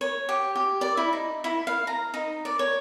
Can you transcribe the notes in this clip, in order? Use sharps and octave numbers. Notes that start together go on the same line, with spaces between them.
C#5
G4
G4
D5
E4
D#4
E4
F5
A#5
D#4
D5
C#5